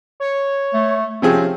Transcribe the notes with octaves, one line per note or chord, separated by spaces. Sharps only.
C#5
A3
C3 F3 C4 C#4 G#4